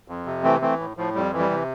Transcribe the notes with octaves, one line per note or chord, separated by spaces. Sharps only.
F2
C3
E3 A3 C4
E3 A3 C4
A2
A2 F3
F2 G3
E3
G3
C3